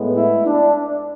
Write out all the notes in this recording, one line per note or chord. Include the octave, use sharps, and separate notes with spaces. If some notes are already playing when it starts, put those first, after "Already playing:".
Already playing: A2 G#3 B3
E4
D4